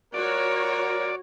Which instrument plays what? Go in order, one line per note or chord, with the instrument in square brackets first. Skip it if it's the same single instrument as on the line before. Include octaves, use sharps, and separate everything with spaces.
[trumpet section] G3 F4 A#4 [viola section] F#4 C#5 [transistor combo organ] D5